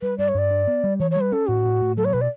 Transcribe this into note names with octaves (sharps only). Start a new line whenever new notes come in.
G3 B4
G2 D5
C#5
G2 D5
D4
B3
G3
E3 C#5
G3 C#5
B4
C#4 A4
A2 F#4
A2
A2
F#3 A4
C#5
B2 B4
D5